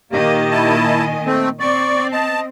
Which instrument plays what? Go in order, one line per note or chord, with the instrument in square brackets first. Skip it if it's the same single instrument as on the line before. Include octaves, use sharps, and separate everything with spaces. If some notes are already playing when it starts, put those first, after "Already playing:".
[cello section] A#2 D#3 D#5 [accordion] A#3 [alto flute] G4
[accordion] E4 A5
[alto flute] G#5
[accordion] A3 C4
[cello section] C4 [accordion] D5 [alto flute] C#6
[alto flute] D#5 [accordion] A5